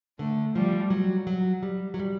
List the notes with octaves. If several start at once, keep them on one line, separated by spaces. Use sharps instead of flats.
D3 A3
F3 G3
F#3
F#3
G3
F#3
G3